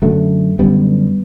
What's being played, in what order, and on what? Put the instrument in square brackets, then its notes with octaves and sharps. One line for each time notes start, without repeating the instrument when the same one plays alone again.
[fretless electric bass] F#2 D3 F#3 A3
F#2 D3 G3 B3